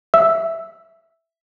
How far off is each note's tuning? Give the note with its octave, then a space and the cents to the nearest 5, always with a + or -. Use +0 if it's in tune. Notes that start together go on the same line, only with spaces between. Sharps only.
E5 +0 E6 +0